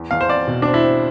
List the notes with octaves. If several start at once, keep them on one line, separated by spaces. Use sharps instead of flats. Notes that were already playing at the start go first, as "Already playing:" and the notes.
Already playing: E2
E2 F5
C5
C4 D5
B2
C4 D4
E4
C4